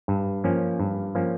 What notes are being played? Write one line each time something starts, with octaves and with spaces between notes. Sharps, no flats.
G2
F3 A#3 C#4
G2
F3 A#3 C#4